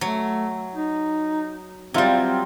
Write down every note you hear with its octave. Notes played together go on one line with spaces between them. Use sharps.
F#3 A3
D#4
F#3 G3 C4 F4 E5